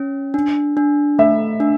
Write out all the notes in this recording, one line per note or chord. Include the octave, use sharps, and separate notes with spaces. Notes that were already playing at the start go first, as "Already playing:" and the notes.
Already playing: C#4
D4
D4
A3 E5
D4